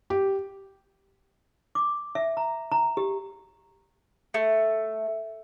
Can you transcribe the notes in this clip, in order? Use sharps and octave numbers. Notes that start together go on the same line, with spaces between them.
G4
D6
E5
A#5
A#5
G4
A3